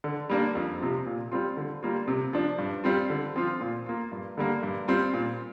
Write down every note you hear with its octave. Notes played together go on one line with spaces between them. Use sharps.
D3
G3 A#3 D4
F2
C3 F3
A#2
G3 C4 F4
D3
G3 A#3 F4
C3
F3 D4
G2
G3 C4 F4
D3
F3 C4 F4
A#2
A#3 F4
G2
D3 G3 A#3
G2
G3 C4 F4
A#2